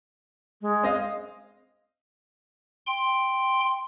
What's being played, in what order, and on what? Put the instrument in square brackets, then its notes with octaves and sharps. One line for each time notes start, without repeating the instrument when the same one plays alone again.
[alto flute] G#3
[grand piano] C4 D#5 F5
[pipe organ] G5 C6